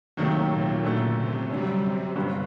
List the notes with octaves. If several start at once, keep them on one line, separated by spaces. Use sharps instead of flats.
D#2 C3 D#3 F#3 A3
A#2
F#2 A#2 D3 A3
C3
F#2 D3 F#3 G3
C3
G1 G2 D3 G3